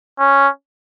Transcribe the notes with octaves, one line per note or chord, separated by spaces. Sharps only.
C#4